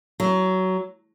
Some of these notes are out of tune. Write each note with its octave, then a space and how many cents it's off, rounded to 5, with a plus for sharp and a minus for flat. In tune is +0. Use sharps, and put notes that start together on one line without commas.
F#3 +15